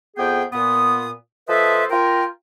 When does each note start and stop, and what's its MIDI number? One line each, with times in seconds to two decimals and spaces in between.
0.17 0.43 41
0.17 0.43 59
0.17 0.43 68
0.17 0.43 79
0.53 1.10 46
0.53 1.10 59
0.53 1.10 87
1.48 1.84 53
1.48 1.84 69
1.48 1.84 71
1.48 1.84 72
1.48 1.84 75
1.48 1.84 76
1.90 2.24 65
1.90 2.24 70
1.90 2.24 79